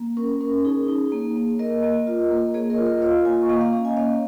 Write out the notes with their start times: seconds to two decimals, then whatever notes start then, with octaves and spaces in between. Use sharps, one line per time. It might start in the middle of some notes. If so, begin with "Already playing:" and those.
Already playing: A#3
0.17 C#4 A#4
0.41 C#4 A#4
0.65 D#4 G#4 C#5
0.88 D#4
1.12 A#3
1.36 A#3
1.59 A#3 A#4 D#5
1.83 A#3
2.07 F4
2.30 A#3
2.54 A#3 G#4 C#5
2.70 A#4 D#5
2.78 F4
2.86 A#4 D#5
3.02 F4 C#5 F5
3.25 A#3 D#5 G#5
3.42 C#6
3.49 A#3 F5 A#5
3.61 F5 A#5
3.73 C#4 F5 A#5
3.85 D#5 G#5
3.97 A#3 C#5 F5